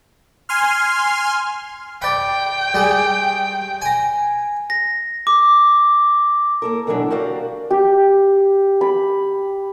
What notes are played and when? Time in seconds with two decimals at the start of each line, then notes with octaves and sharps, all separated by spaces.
0.49 G#5 C6 F6
2.02 D5 G5 B5
2.74 G3 G#4
3.82 G#5 A#5
4.70 A#6
5.27 D6
6.62 A#3 A4 A#4
6.87 B2 D3 E3 F#3 D4 A4
7.10 F#4 G4 A#4 D5 F5
7.70 G4
8.81 B5